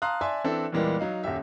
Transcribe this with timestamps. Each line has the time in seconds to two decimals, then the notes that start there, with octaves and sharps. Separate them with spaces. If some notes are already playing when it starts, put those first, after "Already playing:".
0.02 F5 A5 A#5 C6 D#6 F#6
0.21 D5 E5 G#5 A5 C6
0.44 E3 C4 D4 A4 E5
0.72 E2 A#2 E3 G3 G#3 A#3
1.00 F#3 D#4 F5
1.24 D#1 F#2 G4 E5